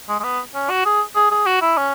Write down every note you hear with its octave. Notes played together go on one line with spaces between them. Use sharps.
G#3
G#3
B3
C#4
F#4
G#4
G#4
G#4
F#4
E4
C#4